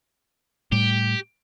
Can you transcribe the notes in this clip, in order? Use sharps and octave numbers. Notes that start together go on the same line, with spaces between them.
A2 G3 G4